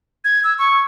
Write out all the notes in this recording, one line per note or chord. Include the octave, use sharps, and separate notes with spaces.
G#6
E6
C#6